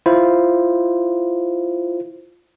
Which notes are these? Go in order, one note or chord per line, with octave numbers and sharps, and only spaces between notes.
E4 F4 C5